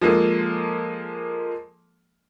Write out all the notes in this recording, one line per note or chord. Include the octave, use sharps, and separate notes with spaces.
F3 G#3 A#3 A4